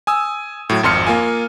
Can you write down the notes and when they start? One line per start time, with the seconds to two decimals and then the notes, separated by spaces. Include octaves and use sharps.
0.07 G#5 D#6 E6
0.69 A2 F#3
0.83 G#1 F2 C6 F6 C#7
1.06 A#3 F4 G#5